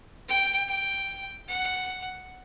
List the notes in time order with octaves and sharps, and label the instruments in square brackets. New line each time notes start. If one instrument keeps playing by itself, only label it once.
[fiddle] G5
G5
F#5